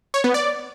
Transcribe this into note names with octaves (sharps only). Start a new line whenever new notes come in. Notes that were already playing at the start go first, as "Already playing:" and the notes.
C#5
B3
D5